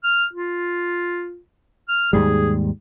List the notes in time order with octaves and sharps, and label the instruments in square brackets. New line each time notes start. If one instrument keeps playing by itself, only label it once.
[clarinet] F6
F4
F6
[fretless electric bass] D#2 G#2 G3 [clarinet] G#4